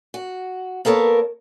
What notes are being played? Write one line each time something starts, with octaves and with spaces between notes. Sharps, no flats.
F#4
A#3 B3 A4 A#4 C#5